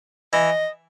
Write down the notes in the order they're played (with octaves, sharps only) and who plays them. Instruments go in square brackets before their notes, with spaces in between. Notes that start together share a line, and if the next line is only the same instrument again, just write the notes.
[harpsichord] E3 [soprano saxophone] D#5